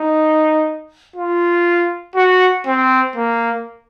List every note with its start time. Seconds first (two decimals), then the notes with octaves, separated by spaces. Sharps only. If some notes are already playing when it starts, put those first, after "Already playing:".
Already playing: D#4
1.16 F4
2.15 F#4
2.66 C4
3.16 A#3